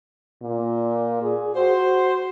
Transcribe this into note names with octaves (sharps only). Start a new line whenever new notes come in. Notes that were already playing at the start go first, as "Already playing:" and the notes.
A#2
G#4
F#4 C5